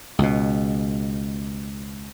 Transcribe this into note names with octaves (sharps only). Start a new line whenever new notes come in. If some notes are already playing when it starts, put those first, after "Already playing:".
C#2 B2